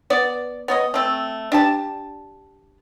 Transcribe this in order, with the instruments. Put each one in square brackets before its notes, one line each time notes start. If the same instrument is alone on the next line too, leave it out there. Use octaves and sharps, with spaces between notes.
[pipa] B3 D5
B3 C#5 D#5
A3 C4
D4 G4 A5